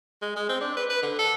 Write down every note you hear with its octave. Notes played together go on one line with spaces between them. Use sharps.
G#3
G#3
C4
D4
B4
B4
D3
A4